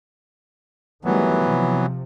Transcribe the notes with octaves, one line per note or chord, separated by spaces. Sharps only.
D#3 E3 F#3 G3 A3 B3
C3 F3